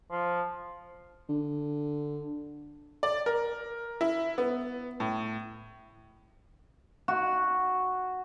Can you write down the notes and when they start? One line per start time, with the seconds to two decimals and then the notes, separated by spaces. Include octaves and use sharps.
0.11 F3
1.29 D3
3.03 D5
3.26 A#4
4.01 E4
4.38 B3
5.00 A2
7.08 F#4